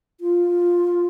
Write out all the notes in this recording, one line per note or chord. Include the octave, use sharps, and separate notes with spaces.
F4